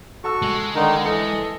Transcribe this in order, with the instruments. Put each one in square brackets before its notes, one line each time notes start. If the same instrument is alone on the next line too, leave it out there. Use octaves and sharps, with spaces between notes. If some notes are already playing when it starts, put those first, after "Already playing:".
[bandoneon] F#4 C#6 [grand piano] A4 A5 E6
[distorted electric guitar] G#3
[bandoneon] D3 D#3 D#4 [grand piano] A#4
[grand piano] E3 A4 C#7 [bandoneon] D#5